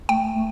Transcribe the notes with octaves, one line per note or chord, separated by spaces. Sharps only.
A3 G5
A3